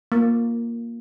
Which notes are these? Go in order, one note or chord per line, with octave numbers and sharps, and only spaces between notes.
A#3